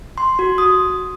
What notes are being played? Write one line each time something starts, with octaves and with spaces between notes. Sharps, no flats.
C6
F#4
D#6